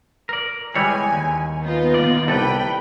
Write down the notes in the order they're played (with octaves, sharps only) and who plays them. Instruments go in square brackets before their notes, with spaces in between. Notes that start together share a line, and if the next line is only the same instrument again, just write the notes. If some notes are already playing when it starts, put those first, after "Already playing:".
[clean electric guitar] A#4 D5
[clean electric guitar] E2 G#3 C#5 [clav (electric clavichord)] E3 G3 E4 [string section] G#5
[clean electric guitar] D#2
[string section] B3 D#4 F4
[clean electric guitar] D#2 D5
[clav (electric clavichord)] C2 D5 [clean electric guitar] A4 B4 [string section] G5 B5